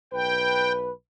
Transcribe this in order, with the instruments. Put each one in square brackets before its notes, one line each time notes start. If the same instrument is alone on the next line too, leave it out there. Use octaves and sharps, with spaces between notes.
[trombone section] B1 B4 [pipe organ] G5